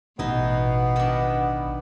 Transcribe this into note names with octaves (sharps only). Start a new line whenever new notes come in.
A1 B2 E3 B3 D#4
D#3 D4